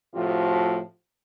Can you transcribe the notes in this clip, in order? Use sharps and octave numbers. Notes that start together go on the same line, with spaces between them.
A2 C3 F3 A3 F4 F#4